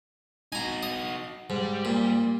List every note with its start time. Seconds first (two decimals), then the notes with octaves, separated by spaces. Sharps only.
0.52 D#4 F#4 G#5 A#5
0.83 D#5
1.50 G#2 G3
1.85 A#2